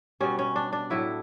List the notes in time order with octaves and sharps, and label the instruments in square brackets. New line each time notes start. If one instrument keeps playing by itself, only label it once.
[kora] B2 G3 C#4
C#4
D4
D4
A2 F#3 E4